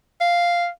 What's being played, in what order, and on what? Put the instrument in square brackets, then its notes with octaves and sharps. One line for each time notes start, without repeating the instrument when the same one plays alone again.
[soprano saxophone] F5